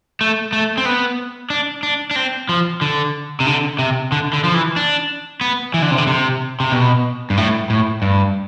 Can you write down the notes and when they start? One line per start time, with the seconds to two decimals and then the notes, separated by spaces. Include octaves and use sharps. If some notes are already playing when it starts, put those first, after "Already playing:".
0.21 A3
0.53 A3
0.78 C4
0.85 B3
1.50 D4
1.83 D4
2.11 D4
2.16 C4
2.49 F3
2.81 D3
3.40 C3
3.46 D3
3.79 C3
4.12 D3
4.33 D3
4.44 F3
4.55 E3
4.76 D4
5.41 B3
5.74 E3
5.82 D3
5.91 C3
5.98 D3
6.07 C3
6.60 C3
6.72 B2
7.30 G2
7.37 A2
7.70 A2
8.02 G2